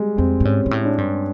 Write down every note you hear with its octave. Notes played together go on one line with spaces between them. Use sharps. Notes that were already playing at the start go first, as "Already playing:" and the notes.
Already playing: G3 G#3
F2 C4
A2
G#2 C#4
G#2
A2
D4
G2